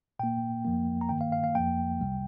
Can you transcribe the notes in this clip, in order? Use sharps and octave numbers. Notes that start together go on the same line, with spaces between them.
A#2 A#3 G5
F2 F3 A#3
A#5
G2 D#3 A#3 G5
F5
F5
F5
F2 F3 A#3 G5
C2 C3 G3